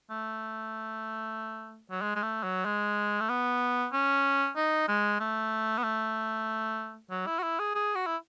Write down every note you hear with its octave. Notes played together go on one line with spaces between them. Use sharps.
A3
F#3
G#3
G#3
A3
F#3
G#3
A3
B3
C#4
D#4
G#3
A3
B3
A3
F#3
E4
F#4
E4
G#4
G#4
F#4
E4